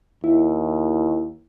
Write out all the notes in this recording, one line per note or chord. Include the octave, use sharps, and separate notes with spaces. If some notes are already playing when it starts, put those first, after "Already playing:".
D#2 E4